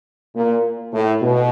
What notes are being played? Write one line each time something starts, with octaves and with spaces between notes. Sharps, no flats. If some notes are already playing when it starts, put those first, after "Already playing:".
A#2
A2
B2